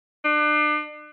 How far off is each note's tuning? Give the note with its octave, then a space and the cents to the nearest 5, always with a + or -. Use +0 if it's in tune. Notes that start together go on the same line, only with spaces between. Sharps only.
D4 +35